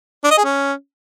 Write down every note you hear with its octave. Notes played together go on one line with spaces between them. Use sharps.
D4
D#5
G#4
C#4